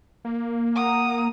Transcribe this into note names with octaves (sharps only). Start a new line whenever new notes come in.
A#3
F#5 A#5 D#6